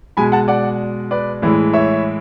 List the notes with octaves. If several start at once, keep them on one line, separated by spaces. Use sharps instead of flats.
B2 G#3 G#5 B5
F#5 A5
D5 F#5
B4 D5
A2 E3 G#3
C#5 E5